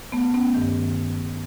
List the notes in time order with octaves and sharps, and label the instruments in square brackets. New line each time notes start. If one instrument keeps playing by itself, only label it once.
[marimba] A3 B3
B3 C#4
G2 D#3